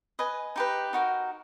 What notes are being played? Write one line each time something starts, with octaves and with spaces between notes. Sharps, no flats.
B4 D#5 G#5
D#4 G4 B4
D#4 F#4 A#4